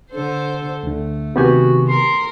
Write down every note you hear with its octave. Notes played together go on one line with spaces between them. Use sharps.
D3 A4 C5
D2 D3 A3
C3 D#3 B3 F#4 G4 G#5
A#4 C6